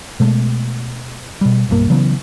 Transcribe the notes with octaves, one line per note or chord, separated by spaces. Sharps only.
B2 G#3 A3
B2 G3
D1 B1 G2 A#3
C#3 E3 F#3 B3